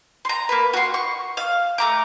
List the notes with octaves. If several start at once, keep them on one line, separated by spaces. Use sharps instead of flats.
A#5 C6
A#3 B4
F#4 C6
C#6
F5
A3 A#5 D6